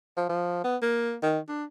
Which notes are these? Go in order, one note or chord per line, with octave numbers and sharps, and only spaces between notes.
F3
F3
B3
A#3
D#3
D4